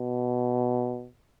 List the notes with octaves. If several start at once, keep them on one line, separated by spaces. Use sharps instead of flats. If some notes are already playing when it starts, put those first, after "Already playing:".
Already playing: B2